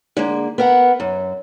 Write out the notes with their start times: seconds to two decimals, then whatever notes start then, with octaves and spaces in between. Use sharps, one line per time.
0.17 D3 G#3 A#3
0.58 B3 A#4 F#5
1.00 F#2